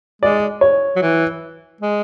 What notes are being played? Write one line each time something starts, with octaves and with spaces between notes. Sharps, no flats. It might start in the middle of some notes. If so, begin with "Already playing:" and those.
G#3 D5
C#5
F#3
E3
G#3